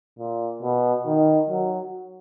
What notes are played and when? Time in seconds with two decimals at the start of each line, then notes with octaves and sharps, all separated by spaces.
0.19 A#2
0.62 B2
1.06 D#3
1.50 F#3